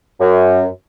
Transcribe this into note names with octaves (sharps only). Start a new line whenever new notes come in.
F#2